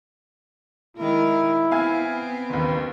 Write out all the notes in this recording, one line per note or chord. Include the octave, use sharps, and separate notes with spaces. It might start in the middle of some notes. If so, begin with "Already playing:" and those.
D#3 G#3 E4 A#4
B3 C4 F5 G#5 G#6
F#1 D#2 B4